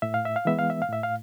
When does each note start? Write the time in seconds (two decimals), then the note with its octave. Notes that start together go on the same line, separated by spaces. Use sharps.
0.02 A2 E5
0.14 F5
0.25 E5
0.36 F5
0.45 E3 G#3 B3 E5
0.59 F5
0.70 E5
0.82 F5
0.89 A2 E5
1.03 F5